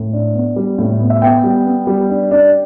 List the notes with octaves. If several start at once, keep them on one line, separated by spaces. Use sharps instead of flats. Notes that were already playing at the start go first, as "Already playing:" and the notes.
Already playing: A2
D4
B3
G3
A2
B3
E5
B3 G5
G3
B3
G3
D4
D4